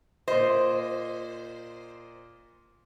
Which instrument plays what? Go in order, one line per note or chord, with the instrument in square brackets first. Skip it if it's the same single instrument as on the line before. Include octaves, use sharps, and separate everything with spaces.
[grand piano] A#2 D#5 [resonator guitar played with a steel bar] C5